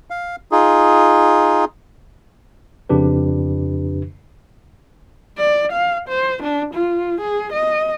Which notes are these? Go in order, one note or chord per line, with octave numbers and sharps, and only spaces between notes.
F5
D#4 F4 G#4
F2 C#3 D4 G4 B4
D5
F5
C5
D4
F4
G#4
D#5